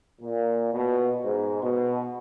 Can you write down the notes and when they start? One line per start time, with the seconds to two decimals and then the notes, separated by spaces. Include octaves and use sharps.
0.21 A#2
0.73 B2
1.23 G#2
1.62 B2